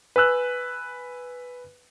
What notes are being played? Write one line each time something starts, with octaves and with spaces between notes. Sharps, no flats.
B4 G#5 E6 F#6